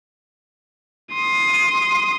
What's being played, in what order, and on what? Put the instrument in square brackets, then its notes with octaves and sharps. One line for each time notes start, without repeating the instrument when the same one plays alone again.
[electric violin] C6 D#6